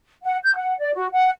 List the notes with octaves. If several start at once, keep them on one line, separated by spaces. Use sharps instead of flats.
F#5
G6
F#5
D5
F#4
F#5